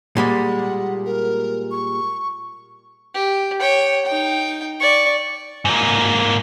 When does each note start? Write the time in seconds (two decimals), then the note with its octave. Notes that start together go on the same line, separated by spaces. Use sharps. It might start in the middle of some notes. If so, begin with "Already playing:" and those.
0.17 A#2 G3 G#3 F#5
1.06 A#4
1.71 C#6
3.15 G4
3.60 C#5 G5
4.05 D#4 G5
4.80 D5 C#6
5.65 G#2 A#3